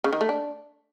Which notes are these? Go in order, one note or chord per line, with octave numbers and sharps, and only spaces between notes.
C#3
D#3
A3
D4